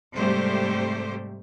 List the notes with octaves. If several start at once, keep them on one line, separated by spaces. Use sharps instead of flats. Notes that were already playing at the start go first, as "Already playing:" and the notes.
G#2 C3 G3 A3 G4 C5